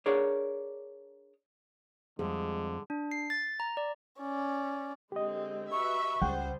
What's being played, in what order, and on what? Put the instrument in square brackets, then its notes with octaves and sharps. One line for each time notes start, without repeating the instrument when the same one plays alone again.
[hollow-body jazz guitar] D4 G#4 A#4 C#5 D5
[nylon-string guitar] F2 [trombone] D3 [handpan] G3 G#4 [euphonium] G#3
[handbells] D4
C7
A6
A#5
D5
[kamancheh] C#4 D5
[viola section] D3 G#3 C4 [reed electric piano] G4 D#5
[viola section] F#4 B4 E5 [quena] C#6
[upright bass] C#2 [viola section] G3 G#4 C5 [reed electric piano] F#5 G5